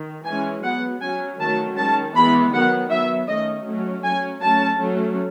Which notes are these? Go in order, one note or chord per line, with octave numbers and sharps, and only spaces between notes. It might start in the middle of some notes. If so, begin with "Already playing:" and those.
Already playing: D#3
E3 G#3 C#4 G#5
F#3 B3 F#5
F#3 C#4 G#5
D#3 F#3 A3 C#4 A5
D#3 G#3 C#4 A5
E3 G#3 B3 B5
D#3 F#3 B3 F#5
F#3 B3 E5
D#3 A3 C#4 D#5
F#3 A3 C#4
F#3 C#4 G#5
F#3 A3 C#4 A5
F#3 A3 C#4